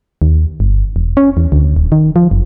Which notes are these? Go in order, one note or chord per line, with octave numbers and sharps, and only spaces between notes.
D#2
G1
E1
C#4
E2
D2
D#1
D#3
F3
F#1